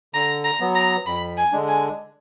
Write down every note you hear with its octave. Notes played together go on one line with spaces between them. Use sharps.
D3 A#5
A#5
F#3 B3
A#5
F2 B5
G#5
D3 G#3 D4
G#5